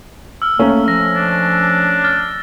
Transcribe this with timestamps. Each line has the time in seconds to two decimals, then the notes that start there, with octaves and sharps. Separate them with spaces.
0.42 E6 F6
0.59 A3 A#3 C#4
0.88 F3 A#6
1.15 D4
2.04 F6 A6